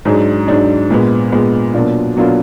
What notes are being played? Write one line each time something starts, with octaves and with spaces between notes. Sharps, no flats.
G#2 F#3 D4 G#4
G#2 F#3 D4 G#4
A#2 G#3 B3
A#2 G#3 B3
B2 F#3 A#3 D4 F4
B2 F#3 A#3 D4 F4